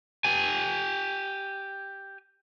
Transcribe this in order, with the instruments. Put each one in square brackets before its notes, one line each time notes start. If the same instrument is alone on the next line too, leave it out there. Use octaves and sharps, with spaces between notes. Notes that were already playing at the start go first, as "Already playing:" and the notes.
[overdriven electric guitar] G4 G#5